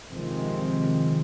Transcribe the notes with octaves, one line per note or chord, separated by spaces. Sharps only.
C3 D#3 F3 G#3 C4